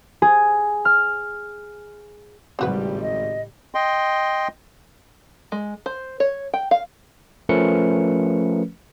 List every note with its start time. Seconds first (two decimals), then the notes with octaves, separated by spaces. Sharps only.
0.22 G#4
0.85 F6
2.59 G#1 A2 C#3 G3 C4 F#4 B4
3.01 D#5
3.75 D#5 G5 C6
5.52 G#3
5.86 C5
6.20 C#5
6.53 G5
6.71 F5
7.49 F3 A3 C#4 A#4 B4 C#7